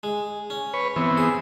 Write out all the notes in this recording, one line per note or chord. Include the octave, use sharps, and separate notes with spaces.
G#3
C#4
B4 C#5
E3 B3 C4
G#4